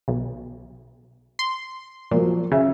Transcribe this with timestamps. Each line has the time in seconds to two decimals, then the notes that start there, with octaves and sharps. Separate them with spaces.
0.08 B1
1.39 C6
2.11 A#2 F3 F#3
2.52 C#3 E5